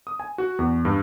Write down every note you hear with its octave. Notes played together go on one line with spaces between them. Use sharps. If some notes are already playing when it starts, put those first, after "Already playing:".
D#6
G#5
F#4
E2
G2